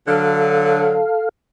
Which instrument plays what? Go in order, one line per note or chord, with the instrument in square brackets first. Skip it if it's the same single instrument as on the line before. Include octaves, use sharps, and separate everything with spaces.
[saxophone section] D3 F#3 [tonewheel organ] A4 F5